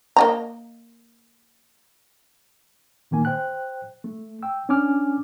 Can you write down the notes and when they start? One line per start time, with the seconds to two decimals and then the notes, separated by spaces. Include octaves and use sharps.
0.16 A#3 D#5 A#5
3.11 A#2 D#3 A#3 G#5
3.25 C5 G5 F#6
4.04 A3
4.43 G5 E6
4.69 C#4 D4 G#5 D6 F6